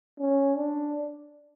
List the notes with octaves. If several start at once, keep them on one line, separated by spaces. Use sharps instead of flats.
C#4
D4